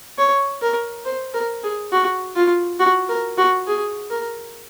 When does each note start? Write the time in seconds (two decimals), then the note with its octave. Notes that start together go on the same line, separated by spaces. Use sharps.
0.18 C#5
0.62 A#4
1.05 C5
1.34 A#4
1.63 G#4
1.92 F#4
2.36 F4
2.79 F#4
3.09 A#4
3.38 F#4
3.67 G#4
4.10 A#4